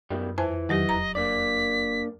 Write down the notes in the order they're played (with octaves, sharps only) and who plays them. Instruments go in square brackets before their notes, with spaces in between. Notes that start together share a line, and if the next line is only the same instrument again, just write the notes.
[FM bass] F#2 [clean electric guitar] B2 D#3 G3
[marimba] F2 C5 G#5 [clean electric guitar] E3
[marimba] E2 F#3 G4 [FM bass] D#3 [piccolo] D#5
[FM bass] D#1 [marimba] A#5
[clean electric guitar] A#3 D4 D5 [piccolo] B6